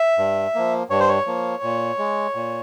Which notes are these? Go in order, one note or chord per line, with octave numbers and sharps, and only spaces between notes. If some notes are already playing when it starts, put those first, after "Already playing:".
Already playing: E5
G2
F3 A#3
G2 C#5
C5
C#5
F3 A#3
A#2
G#3
A#2